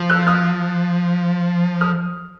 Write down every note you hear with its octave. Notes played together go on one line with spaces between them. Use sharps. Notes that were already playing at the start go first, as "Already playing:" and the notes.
Already playing: F3
E6 F#6
D#6 F6
D#6 F6